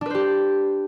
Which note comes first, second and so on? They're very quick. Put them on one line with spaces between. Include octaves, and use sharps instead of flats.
D4 B4 C5 G4